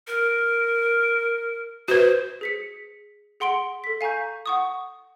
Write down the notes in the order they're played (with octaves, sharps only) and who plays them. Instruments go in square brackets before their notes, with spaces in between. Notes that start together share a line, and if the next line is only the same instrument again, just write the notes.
[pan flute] A#4
[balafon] F#4 B4 [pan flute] C5
[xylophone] G#4 B6 C#7
G#4 F#5 C6 D7 G7
A4 B6
F5 G#5 A#5 C#6 G6
F#5 C#6 D#6